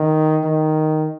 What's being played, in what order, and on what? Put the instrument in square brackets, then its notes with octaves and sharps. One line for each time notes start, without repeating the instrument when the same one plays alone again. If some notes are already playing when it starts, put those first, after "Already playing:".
Already playing: [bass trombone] D#3
D#3